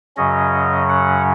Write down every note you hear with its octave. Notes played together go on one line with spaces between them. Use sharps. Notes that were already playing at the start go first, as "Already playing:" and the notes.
F#2 C#3 F#3 C#4 D#5
F#5